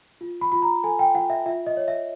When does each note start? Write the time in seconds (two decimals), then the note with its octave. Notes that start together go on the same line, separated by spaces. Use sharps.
0.21 F4
0.41 B5
0.52 F4 B5
0.62 A#5
0.83 A4 G#5
0.99 G5
1.15 F4 F#5
1.30 E5
1.46 F4 E5
1.67 D#5
1.77 C#5
1.88 E5